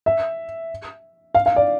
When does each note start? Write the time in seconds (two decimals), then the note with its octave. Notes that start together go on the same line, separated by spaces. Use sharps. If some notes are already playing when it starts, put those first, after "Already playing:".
0.06 E5
1.35 F5
1.46 F5
1.56 D5